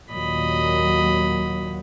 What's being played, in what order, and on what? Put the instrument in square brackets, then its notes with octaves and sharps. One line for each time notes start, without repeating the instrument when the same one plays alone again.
[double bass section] D#2 A#2 F#3 [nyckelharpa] D#5 B5